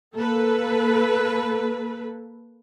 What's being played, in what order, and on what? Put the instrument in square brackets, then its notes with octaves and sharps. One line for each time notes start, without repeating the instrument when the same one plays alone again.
[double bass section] A#3 [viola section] A4 B4